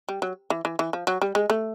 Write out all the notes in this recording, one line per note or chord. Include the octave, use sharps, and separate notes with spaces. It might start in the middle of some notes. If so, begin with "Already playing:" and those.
G3
F#3
E3
E3
E3
F3
F#3
G3
G#3
A3